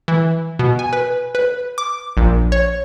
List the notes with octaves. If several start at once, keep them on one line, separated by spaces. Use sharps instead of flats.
E3
B2
G#5
B4
B4
D6
A#1
C#5